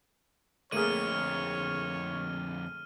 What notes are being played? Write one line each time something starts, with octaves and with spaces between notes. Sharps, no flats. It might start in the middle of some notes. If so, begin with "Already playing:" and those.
F2 D3 A3 A#3 G#4 C#5 F6 D#7